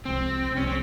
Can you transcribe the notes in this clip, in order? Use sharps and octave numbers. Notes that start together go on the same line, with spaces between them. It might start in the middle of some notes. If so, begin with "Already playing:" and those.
C2 C3 F3 G#3 C4
C2 C3 F3 G#3 C#4
C4